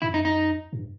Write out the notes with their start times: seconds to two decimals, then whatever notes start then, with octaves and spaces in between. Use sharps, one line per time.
0.02 F#2 E4
0.14 D#4
0.25 D#4
0.73 G2